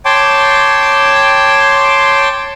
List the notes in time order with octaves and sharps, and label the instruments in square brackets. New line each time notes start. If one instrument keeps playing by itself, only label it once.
[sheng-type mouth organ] C#5 G5 A5 C6 D6